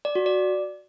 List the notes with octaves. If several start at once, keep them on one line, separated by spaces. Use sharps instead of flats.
D5
F#4
D5